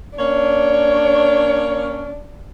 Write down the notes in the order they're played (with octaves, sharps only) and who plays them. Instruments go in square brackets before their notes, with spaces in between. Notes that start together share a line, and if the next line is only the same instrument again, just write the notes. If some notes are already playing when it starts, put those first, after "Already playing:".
[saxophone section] A#3 C#4 C#5 [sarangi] D4